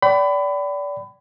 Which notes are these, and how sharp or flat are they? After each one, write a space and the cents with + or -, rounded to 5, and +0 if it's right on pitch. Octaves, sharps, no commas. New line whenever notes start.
D5 -25 G5 -35 B5 +25